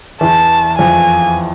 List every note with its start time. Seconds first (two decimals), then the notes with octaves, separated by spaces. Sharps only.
0.21 E2 E3 A5
0.78 F2 F3 G#5